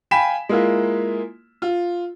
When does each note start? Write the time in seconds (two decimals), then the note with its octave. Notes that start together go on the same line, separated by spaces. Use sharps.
0.11 F5 G5 G#5 B5 B6 E7
0.49 G#3 A#3 E4 F4
1.62 F4